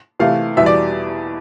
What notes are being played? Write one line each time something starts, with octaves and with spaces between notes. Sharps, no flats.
C3 E3 A3 F5
E2 B2 G3 E5
D5